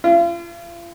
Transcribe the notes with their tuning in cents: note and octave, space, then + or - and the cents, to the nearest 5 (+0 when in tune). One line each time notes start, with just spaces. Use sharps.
F4 -40